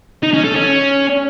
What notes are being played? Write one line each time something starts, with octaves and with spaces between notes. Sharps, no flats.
D#4
C#4
A4
C#4